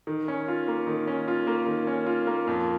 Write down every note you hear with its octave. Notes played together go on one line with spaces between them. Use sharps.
D#3
C#4
F4
A#3
D#3
C#4
F4
A#3
D#3
C#4
F4
A#3
F2